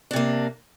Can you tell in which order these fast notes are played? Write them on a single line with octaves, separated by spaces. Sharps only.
D4 C3 A#3